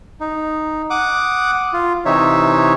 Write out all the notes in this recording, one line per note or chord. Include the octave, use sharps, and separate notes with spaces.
D#4
F#5 D6 D#6
F4
C3 E3 D#4 C#5 E5